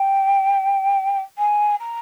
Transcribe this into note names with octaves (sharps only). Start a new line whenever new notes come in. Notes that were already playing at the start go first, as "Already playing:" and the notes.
Already playing: G5
G#5
A#5